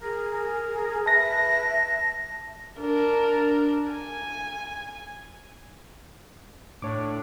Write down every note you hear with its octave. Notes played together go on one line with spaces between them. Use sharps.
G#4 A#4
A#4
B4 E5 A5 A#6
D4 A#4
G#5
A2 D4 C#5 D6